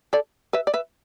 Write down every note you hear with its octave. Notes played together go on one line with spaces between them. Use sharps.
A4 D5
B4 E5
D5
B4 E5